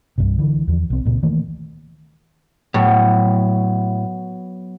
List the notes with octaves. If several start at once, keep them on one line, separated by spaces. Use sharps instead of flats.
C2 G2 C3
D3 E3
E2 F3
B1 C4
C#2 A#2 C4
D#3 E3 A3 A#3
A2 F#3 B3